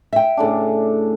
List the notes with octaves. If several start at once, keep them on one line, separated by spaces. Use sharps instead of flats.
E5 G5
A2 C#3 D4